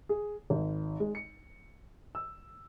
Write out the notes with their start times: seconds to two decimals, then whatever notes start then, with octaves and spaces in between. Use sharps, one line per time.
0.09 G#4
0.50 G#1
1.00 G#3
1.15 C#7
2.15 E6